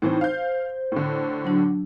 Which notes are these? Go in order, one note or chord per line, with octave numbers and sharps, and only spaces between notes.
A2 E3 C4 D#4 C5
C5 F5 G6
A2 D3
F#3 D4 F#4